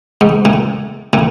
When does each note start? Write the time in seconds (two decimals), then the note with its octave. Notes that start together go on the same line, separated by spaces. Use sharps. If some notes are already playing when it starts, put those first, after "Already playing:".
0.21 G#2
0.45 A2
1.13 A2